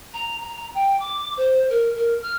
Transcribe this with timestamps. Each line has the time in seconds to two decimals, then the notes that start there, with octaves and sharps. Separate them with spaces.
0.14 A#5
0.41 A#5
0.57 A#5
0.74 G5
1.00 D6
1.37 C5
1.70 A#4
1.96 A#4
2.22 F6